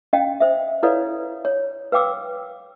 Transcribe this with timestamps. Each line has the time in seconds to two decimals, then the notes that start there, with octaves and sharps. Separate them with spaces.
0.13 C#4 D#5 F5 G5
0.40 C5 E5
0.83 E4 A4 B4 C#5 D5 F5
1.45 C#5
1.92 B4 F5 G5 D6 E6